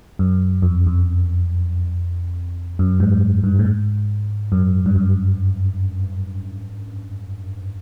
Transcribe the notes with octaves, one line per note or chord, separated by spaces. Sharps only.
F#2
F2
F2
F#2
G#2
G2
A2
G#2
F#2
G2
F#2